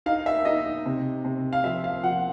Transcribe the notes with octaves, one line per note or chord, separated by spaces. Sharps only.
D#4 F5
E5
D#4 D#5
C3
C3
F5
F3 E5
F5
F3 F#5